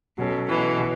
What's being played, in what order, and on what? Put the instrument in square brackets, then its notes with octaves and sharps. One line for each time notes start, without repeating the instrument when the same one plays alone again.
[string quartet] B2 [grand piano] F#3 C#4 A4
[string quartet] B2 E3
[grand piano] B2